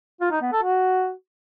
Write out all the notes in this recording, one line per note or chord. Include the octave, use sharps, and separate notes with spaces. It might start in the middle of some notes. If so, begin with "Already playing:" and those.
F4
D#4
B3
A4
F#4